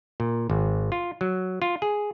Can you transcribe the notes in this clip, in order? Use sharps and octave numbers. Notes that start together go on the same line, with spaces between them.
A#2
G#1
F4
F#3
F4
G#4